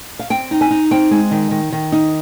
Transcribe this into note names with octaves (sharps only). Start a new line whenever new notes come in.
F5
C4 G5
D#4
G#5
D#4
C4 G5
G#3
D#3
D#3
D#3
D#4